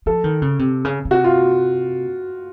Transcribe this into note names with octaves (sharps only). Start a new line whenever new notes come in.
F3 A4
D#3
C#3
C3
C#3
C#3
C3 F#4
F4